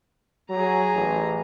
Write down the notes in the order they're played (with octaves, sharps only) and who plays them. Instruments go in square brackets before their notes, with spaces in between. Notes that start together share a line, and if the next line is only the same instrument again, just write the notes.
[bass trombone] F#3 [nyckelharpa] G#4 A#5
[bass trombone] A1